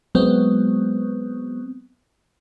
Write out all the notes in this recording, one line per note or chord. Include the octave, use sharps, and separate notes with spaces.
F#3 G#3 B3 C4